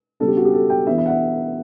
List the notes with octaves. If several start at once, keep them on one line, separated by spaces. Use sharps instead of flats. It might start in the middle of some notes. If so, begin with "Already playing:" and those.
C#3 G3 B3 D4 A4
G4
F#4
G4
A4
G5
E3 B3 D4 E5
E5
F#5
E5